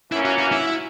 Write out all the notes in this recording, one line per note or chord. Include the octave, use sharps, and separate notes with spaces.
F#2 E3 A#3 C#4 E4
F#4
F#4
E4